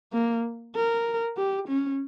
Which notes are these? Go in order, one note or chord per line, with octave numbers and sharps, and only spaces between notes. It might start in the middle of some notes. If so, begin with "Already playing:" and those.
A#3
A#4
G4
C#4